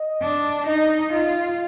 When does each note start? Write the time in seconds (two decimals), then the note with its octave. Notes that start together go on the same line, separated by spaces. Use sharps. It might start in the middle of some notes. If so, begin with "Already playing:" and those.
Already playing: D#5
0.22 D4
0.67 D#4 D#5
1.13 F4